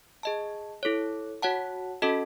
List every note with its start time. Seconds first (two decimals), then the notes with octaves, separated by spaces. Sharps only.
0.23 G#4 D#5 A5
0.83 E4 A4 C#5
1.42 F#4 C#5 F#5 A5
2.02 C#4 F#4 A4 D#5 A5